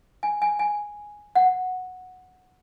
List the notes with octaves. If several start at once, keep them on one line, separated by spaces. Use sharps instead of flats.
G#5
G#5
G#5
F#5